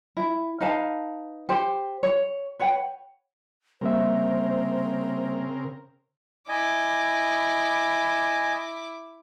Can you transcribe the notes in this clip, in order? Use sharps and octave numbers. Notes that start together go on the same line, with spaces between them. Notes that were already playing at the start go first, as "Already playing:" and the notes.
E4
D#4 B4 F5 A5
G4 C5
C#5
B4 C#5 F#5 G5
C#3 G3 A#3 C4 A#4 C5 E5
E4 D#5 G#5 D6